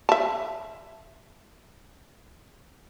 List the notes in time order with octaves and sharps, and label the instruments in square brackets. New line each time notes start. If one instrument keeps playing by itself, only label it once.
[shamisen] E5 A5